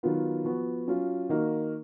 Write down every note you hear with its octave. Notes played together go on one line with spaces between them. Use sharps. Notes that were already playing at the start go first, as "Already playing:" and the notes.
D#3 F#3 B3 F4
F3 B3 F#4
F#3 C#4 F4
D#3 A#3 D#4 F#4